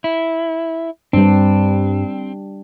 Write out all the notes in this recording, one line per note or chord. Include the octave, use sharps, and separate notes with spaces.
E4
G2 G3 C4 D4